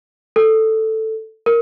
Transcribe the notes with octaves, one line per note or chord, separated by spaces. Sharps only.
A4
A#4